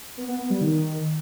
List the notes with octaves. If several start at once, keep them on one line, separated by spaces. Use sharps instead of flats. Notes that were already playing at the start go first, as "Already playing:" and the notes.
B3
B3
B3
G3
D#3